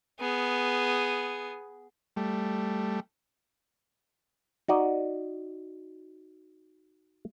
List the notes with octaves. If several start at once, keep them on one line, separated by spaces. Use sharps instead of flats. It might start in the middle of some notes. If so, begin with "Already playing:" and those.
B3 G#4
G3 A3
D#4 F#4 D5 D#5